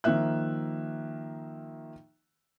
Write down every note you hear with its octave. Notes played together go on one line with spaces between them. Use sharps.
D#3 F3 A#3 E5 F#6